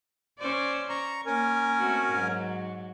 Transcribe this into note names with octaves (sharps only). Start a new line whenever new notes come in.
C#4 C5 D5
A#5 C#6
A#3 C#4 A#4 G#5
A3 C4 F#4
G#2 F#3